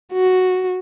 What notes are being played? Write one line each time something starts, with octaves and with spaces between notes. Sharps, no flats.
F#4